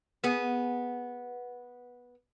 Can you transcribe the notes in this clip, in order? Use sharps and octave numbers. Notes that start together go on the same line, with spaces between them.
B3 G#4